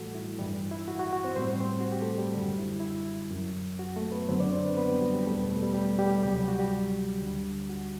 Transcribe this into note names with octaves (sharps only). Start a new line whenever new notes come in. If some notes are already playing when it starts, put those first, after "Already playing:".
Already playing: A2 E3 G3 A3 F#4 A4
E4
G2 E3 G3 G4
E4
F#4
F#4
F#4
C4 C5
A2 G3 C4 C5
C4 C5
F#4
G4
A3 A4
G3 G4
F#2 D3 G3 F#4
E4
E4
F#2 F#3
F#4
A3 A4
B3 B4
F#2 D3 F#3 C4 C5
D4 D5
C4 C5
B3 B4
B3 B4
G3 G4
F#4
G3 G4
E2 B2 G3 A3 A4
B3 B4
A3 A4
G3 G4
G3 G4
G3 G4
D2 C3 F#3 G3 G4
G3 G4
F#4
G3 G4
D2 D3 G3
F#4